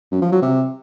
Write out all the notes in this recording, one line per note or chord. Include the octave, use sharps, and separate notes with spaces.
F#2
F3
F#3
C3